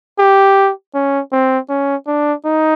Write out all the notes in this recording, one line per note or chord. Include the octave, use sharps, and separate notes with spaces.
G4
C#4
C4
C#4
D4
D#4